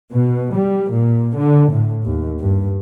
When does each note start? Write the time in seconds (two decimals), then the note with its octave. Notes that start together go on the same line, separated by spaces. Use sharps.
0.12 B2
0.55 G3
0.92 A#2
1.37 D3
1.71 A2
2.05 D#2
2.40 G2